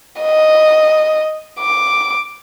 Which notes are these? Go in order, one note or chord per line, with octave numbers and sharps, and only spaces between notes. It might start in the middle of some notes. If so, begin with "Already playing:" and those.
D#5
D6